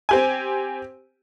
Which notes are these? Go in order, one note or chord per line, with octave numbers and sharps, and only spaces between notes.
C4 G4 G#5